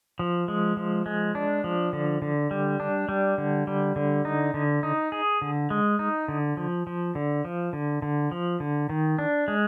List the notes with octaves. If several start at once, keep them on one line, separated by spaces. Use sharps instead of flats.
F3
G#3
F3
G#3
D4
F3
D3
D3
G3
D4
G3
D3
G3
D3
D#4
D3
D#4
G#4
D3
G#3
D#4
D3
F3
F3
D3
F3
D3
D3
F3
D3
D#3
D4
G#3